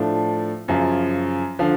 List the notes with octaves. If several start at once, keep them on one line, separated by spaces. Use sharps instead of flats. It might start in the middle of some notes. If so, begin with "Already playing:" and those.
Already playing: A2 F3 A3 D4
F#2 C#3 F3
D3 F3